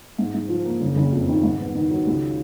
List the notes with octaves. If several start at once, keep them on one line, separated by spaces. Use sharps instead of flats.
G#2
G#2
F3
A#3
F#1
F#1
F2
D#3
G#2
B3
D#3
F#3
C#2